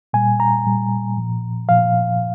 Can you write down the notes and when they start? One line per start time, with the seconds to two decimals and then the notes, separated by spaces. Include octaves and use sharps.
0.13 A#2 G3 G#5
0.40 A#5
0.66 A#2 G3
1.17 A#2 F3
1.69 A#2 F3 F5